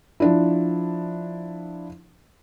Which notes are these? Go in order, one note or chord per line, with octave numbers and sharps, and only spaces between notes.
F3 D4 E4